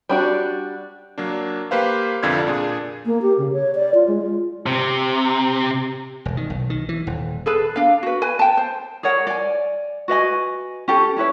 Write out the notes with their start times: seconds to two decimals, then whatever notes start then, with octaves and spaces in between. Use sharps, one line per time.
0.09 G3 D4 F#4
1.18 F#3 A#3 D4
1.71 A#3 G4 B4 C5 F5
2.23 C2 F2 D3 F4 D5 G#6
2.47 A#2 D4 G#4
3.06 A#3
3.22 G4
3.38 C#3
3.53 C#5
3.75 D5
3.94 F4
4.08 G#3
4.22 F4
4.66 C3
6.25 E1
6.37 D#3
6.50 B1
6.70 D#3
6.89 E3
7.07 D#1
7.46 G#4 A4 B4
7.76 D4 F5
8.03 F#4 B4
8.22 B4 G#5
8.39 G5 A5
8.57 C5
9.03 G#4 A#4 C#5 F#5
9.27 D5 G#5
10.08 F#4 B4 D#5 G#5
10.88 C#4 G4 A4
11.17 C#4 E4 B4 C#5